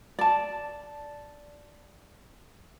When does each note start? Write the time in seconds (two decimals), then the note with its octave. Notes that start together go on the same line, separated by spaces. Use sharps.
0.19 D5 A5